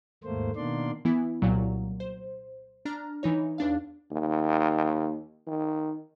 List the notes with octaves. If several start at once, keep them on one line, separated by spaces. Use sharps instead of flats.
D#2 G#2 A3 A#3 C5
B2 D#3 A#3 D4 D5 C6
E3 B3 E4
C2 A#2 F#3
C5
D4 A#5 F6
E3 D#4 C#5
E2 D4 F5
D#2
D#3